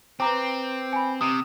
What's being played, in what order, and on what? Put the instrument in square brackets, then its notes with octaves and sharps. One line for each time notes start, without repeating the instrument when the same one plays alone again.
[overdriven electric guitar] C4 [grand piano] B4 A#5 D6
[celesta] G#5 B5
[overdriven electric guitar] C3 [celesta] D#6